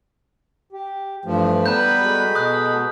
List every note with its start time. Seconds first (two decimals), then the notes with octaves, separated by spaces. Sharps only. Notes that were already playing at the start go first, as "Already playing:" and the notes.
0.73 G4
1.25 G2 E3 F3 A3
1.66 G3 B3 B4 A#5 B5 G6
2.02 G#3 F#4 A4
2.35 B2 D#6 F#6